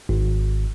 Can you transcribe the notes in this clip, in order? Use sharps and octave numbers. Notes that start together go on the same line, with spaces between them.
G#1